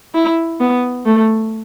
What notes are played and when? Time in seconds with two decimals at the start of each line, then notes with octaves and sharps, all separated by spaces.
0.14 E4
0.60 B3
1.06 A3